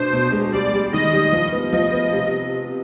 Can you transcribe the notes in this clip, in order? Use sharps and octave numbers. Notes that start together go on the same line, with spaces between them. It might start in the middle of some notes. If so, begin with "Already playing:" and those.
Already playing: B2 D4 C5
B2
G#3
G3 D5
G3
D#3 D#5
G3
F3
B3
F3 D#5
B3
C3